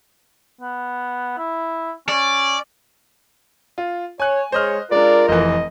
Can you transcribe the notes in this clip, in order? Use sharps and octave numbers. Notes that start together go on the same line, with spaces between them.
B3
E4
C#4 D5
F4
C#5 G#5 F#6
G#3 C5 C#5 D#5 F6
G#3 D4 F4 A#4 D5
F1 E3 D#5